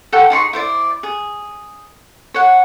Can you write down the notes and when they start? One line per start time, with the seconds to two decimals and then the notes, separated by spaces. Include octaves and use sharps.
0.12 A4 F#5 G5 C#6
0.30 D#4 G#4 C6 C#6
0.53 E4 C5 D5
1.03 G#4
2.34 C#5 F#5